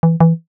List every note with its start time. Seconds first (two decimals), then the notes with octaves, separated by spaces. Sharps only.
0.03 E3
0.20 E3